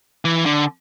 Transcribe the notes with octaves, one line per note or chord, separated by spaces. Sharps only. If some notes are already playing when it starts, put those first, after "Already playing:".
E3
D3